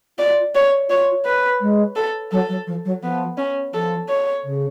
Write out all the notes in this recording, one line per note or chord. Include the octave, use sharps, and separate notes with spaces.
F4 D5
C#5
F4 C#5
B4
G#3
A4
F#3 A4
F#3
F3
F#3
F3 B3
C#4
F3 A4
C#5
C#3